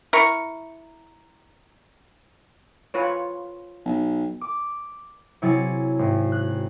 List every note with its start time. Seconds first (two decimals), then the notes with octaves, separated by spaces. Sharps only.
0.13 E4 A#4 C#6
2.94 F4 B4 C#5
3.85 B1
4.41 D6
5.42 C3 F#3 E4 G#4 A6 C#7
5.99 G#1
6.32 F#6